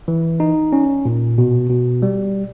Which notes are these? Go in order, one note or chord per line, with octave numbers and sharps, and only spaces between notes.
E3
D#4
C#4
A#2
B2
B2
G3